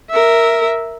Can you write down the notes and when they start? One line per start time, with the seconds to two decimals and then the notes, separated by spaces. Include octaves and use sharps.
0.10 A#4 E5